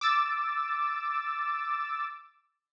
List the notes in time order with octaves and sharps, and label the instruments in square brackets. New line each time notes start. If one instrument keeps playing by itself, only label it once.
[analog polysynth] D6 E6 A6